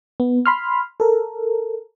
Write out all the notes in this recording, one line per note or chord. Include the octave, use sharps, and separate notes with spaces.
B3
B5 C6 F6
A4 A#4